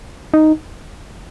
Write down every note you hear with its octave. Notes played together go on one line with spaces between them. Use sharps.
D#4